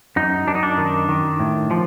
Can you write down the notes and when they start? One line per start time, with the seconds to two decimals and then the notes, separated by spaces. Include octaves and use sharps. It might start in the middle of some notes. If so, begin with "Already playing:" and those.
0.16 F#2 D#4
0.47 F#2 D4
0.55 D#4
0.63 D4
0.78 D#3
1.09 D#3
1.40 A2
1.71 F3